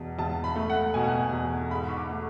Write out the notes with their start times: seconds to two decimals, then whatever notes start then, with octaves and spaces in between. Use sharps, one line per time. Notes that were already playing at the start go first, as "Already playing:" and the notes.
Already playing: E2 B2
0.19 E2 A5
0.44 B5
0.56 A3
0.70 F#5
0.94 B2 G#5
1.04 F#5
1.12 G#5
1.33 E2
1.71 G#2 B5
1.88 C#6
1.97 D6
2.10 A3